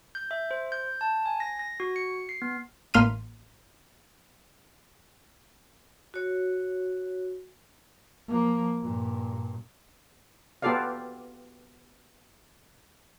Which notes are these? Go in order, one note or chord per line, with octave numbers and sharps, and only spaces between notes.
G6
E5
C5
G6
A5
G#5
A#6
A#6
F#4
C#7
C7
B3
A1 A#3 C6 F6 B6 D#7
F#4 C#5
F3 A#3
G2 A#2
B3 F4 G4 A4 D5 F5